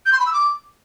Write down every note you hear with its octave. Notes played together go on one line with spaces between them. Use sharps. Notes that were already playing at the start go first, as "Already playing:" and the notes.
G6
C6
B5
E6
D6